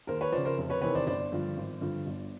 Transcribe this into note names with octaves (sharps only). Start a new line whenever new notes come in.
D#2 A#4 C5
B4 C#5
C#3 F3 C5 D5
A#4 C5
F1
B4 C#5
E2 C3 D#3 B4 C#5
C5 D5
G1 C5 D5
G2 D3 F3
G#1
G2 D3 F3
G1